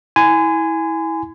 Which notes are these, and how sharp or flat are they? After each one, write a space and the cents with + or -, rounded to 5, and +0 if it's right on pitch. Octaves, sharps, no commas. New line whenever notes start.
E4 -20 G#5 +0 C6 -45